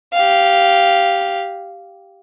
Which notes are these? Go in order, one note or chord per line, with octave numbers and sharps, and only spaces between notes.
G4 F5